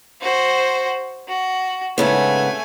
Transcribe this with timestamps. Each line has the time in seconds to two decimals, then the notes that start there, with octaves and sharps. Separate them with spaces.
0.21 F#4 C5
1.28 F#4
1.98 G#2 C#3 A3 B3 G#5